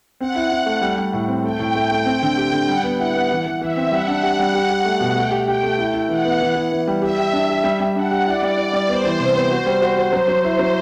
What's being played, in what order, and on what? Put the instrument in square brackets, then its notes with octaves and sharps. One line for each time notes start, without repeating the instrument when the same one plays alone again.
[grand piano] C4 [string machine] F#5
[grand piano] E4
E4
A3
G3
G3
A2
C4
[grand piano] A3 [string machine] G5
[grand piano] A2
A3
A3
[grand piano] C4 [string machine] G5
[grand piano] D3
G4
D3
[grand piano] G3 [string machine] F#5
[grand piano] B3
[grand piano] E4 [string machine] F#5
[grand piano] B3
E3
E3
[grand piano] E3 [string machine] E5
[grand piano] C4
[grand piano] G3 [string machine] F#5
[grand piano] D4
G4
G3
[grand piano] G4 [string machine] F#5
[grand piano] G4
A3
B2
[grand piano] A3 [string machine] G5
[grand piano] G4
[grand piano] G4 [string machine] G5
[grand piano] A3
E4
E4
[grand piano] E3 [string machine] F#5
[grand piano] B3
E3
E3
E3
G3
[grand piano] G4 [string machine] E5
[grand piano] G4
D4
G4
G3
G3
[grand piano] D4 [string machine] F#5
[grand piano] G4
[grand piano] E4 [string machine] D5
[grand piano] G3
E4
G3
[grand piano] B3 [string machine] C5
[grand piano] E3
C3
B3
F#4
G3
F#4
F#4
F#3
F#3
E4
F#3